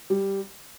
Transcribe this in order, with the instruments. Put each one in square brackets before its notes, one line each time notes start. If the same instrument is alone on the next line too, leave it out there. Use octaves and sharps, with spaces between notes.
[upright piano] G3